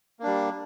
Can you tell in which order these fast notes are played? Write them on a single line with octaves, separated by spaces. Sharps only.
A#3 D4 G3